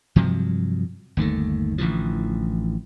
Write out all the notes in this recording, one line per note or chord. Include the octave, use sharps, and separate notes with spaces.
G2 C3 F3 F#3
G1 D#2 D#3 A3
A1 D3 E3 F3